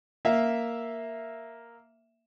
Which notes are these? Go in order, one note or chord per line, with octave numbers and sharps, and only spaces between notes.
A#3 E5 F5